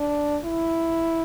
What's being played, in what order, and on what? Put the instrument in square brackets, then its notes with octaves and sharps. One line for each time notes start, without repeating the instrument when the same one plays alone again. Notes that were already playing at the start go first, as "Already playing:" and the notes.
Already playing: [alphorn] D4
E4